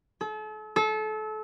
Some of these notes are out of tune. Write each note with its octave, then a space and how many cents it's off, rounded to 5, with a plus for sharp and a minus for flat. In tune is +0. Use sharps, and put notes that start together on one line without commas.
A4 -40
A4 -30